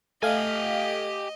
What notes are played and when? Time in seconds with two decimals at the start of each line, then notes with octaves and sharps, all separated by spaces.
0.23 A3 G4 D#5 F5 G#5